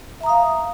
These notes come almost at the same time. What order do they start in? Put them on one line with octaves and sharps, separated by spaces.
E5 A#5 D#6 F5